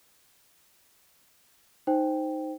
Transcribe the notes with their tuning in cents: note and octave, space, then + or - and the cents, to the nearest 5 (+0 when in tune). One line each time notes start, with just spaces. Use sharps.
D#4 +0 C5 +0 G5 +0